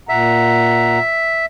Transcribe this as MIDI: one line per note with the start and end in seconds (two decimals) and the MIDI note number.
0.09 0.99 46
0.09 1.46 76
0.09 0.99 78
0.09 0.99 82